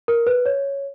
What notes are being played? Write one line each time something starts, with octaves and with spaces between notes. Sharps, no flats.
A#4
B4
C#5